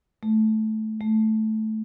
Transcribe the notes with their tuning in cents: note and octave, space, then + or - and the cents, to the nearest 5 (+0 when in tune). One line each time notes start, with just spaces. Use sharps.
A3 -15
A3 -10